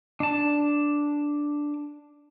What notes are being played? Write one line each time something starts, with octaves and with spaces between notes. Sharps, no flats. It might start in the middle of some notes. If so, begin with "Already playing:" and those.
D4 A5